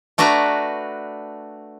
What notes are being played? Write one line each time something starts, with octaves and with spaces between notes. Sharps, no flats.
A3 D4 F#4 B4 A#5